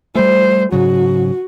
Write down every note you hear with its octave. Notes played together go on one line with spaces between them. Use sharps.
G3 A3 C5
G#2 C#3 F#3 F#4